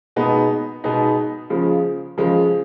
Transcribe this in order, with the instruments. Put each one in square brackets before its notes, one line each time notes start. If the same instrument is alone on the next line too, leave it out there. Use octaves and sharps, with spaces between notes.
[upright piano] B2 G#3 B3 D#4
B2 G#3 B3 D#4
C#3 F3 G#3
C#3 F3 G#3